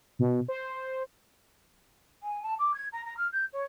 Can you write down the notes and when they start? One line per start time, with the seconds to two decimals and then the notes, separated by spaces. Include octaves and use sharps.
0.19 B2
0.48 C5
2.23 G#5
2.42 A5
2.59 D6
2.74 G#6
2.92 A#5
3.05 A#5
3.17 F6
3.32 G6
3.52 C#5